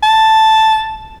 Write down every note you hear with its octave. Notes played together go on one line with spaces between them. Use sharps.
A5